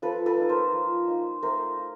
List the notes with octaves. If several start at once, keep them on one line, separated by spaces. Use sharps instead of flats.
F3 A4 B4
A4 B4
A#3 D#4
A#4 C5
F3
A#3 D#4
A3 A#4 C5
F4